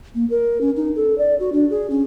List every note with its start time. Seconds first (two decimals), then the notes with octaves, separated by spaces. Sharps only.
0.15 A#3
0.30 A#4
0.61 C#4
0.76 D#4
0.96 A4
1.18 D5
1.40 F#4
1.53 D4
1.71 G#4
1.90 C#4